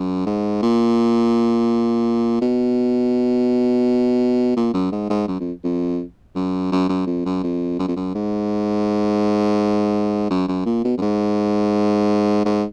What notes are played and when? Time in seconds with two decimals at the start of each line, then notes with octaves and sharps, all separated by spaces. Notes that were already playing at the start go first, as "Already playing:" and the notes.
Already playing: F#2
0.26 G#2
0.62 A#2
2.42 B2
4.57 A#2
4.74 F#2
4.92 G#2
5.10 G#2
5.28 F#2
5.40 F2
5.64 F2
6.36 F#2
6.72 F#2
6.89 F#2
7.07 F2
7.25 F#2
7.43 F2
7.79 F#2
7.88 F2
7.96 F#2
8.15 G#2
10.30 F#2
10.48 F#2
10.66 A#2
10.84 B2
10.98 F#2
11.02 G#2
12.45 G#2